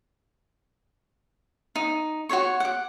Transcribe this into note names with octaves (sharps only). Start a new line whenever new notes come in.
D#4
F#4 C5 C#5 C#6
F#5 D6